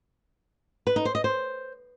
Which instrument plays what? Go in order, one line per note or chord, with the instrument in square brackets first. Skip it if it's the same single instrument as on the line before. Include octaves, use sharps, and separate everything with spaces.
[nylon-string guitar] B4
D#4
C5
D#5
C5